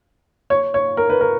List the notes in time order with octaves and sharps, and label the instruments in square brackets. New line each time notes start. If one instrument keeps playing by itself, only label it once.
[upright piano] C#5
C#5
A#4
B4
A#4